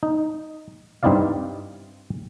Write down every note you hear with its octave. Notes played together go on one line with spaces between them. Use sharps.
D#4
G2 C4 D#4 E4 D5 F5